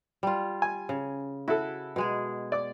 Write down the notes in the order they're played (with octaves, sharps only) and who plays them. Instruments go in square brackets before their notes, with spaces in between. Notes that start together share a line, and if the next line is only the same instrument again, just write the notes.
[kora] G3 F4
[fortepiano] G#5
[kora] C#3
[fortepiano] E4 A4 [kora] F#4
[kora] B2 G#3 G#4
[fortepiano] D5 D6